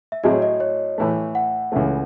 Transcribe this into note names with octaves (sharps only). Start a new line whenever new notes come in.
E5
A2 F#3 C4 E4 G#4 D#5
D#5
C#5
A2 E3 A3
F#5
C#2 C#3 E3 A3